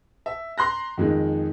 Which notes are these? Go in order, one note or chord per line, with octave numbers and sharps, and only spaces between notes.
E5
A#5 C6 F#6 A#6
F2 D#3 G#3